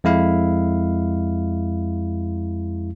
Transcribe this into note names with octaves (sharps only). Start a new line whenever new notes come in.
F2 G#3 E4 F5